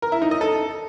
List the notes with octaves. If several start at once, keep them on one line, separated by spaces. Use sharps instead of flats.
A#4
E4
D#4
D#5
A4